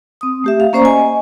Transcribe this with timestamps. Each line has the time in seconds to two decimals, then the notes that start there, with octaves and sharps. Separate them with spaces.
0.21 C4 D#6
0.44 A3 G4 E5
0.60 F5
0.73 A#3 C#4 C5 D5 A#5 C#6
0.85 D#5 G#5